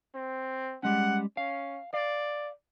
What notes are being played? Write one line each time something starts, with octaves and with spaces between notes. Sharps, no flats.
C4
G3 G#3 C#4 F#5
C#4 F5
D5 F5